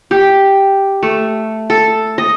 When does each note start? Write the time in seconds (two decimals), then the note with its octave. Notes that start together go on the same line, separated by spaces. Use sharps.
0.11 G4
1.03 A3
1.70 A4
2.18 D#5